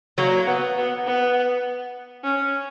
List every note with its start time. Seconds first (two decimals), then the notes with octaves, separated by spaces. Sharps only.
0.18 F#3 A#3
0.47 B3
0.77 B3
1.07 B3
2.24 C#4